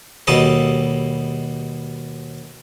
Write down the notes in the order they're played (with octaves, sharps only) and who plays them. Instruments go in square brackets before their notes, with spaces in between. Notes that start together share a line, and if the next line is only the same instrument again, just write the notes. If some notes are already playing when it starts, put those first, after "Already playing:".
[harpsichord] D#2 B2 G3 A4 D#5